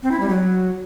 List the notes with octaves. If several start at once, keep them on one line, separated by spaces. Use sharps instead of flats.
C4
E4
G3
F#3